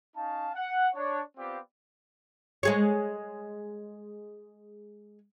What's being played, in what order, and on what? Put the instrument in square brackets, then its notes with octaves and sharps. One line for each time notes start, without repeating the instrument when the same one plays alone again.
[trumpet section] C#4 D#4 F5 A5
F#5
D4 C#5
B3 C4 F4 G4 D5 F5
[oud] G#3 G#4 C#5